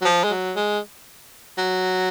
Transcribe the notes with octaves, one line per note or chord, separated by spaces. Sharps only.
F#3
F3
G#3
F#3
G#3
F#3